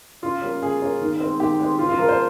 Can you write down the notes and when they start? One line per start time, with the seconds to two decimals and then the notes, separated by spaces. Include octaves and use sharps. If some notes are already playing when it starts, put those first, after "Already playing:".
0.22 C#3 F4
0.42 G3 A#3 C#4
0.62 C#3 G#4
0.81 G3 A#3 C#4
1.01 D#3
1.20 G#3 C4
1.39 D#3 G4
1.59 G#3 C4
1.78 C#3 F4
1.89 F4
1.98 F3 G#3 A#4
2.09 C5